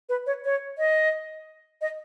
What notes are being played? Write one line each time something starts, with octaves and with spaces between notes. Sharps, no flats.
B4
C#5
C#5
D#5
D#5